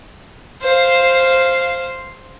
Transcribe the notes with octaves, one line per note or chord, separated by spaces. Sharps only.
C5 F5